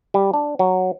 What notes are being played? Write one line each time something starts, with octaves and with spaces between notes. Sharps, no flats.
G3
D4
F#3